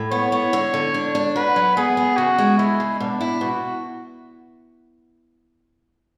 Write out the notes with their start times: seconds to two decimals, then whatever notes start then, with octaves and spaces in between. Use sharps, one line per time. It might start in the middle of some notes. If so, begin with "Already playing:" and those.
Already playing: A2
0.11 B3 C#5
0.32 B3
0.53 D3
0.74 D3
0.94 D4
1.15 D4
1.36 F#4 B4
1.56 F#3
1.77 B3 G#4
1.97 B3
2.17 C#3 F#4
2.38 G#3
2.58 G#3 E4
2.80 C#3
3.00 B2 D4
3.21 E4
3.41 B2 F#4